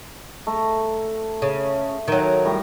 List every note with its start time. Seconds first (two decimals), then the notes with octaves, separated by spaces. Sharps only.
0.47 A3 A#5
1.42 C#3
2.08 D#3 F#3
2.45 A2 G3 A#5